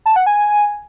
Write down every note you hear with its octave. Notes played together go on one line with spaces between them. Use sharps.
A5
F#5
G#5